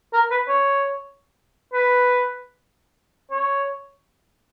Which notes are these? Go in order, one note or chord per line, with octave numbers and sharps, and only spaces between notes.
A#4
B4
C#5
B4
C#5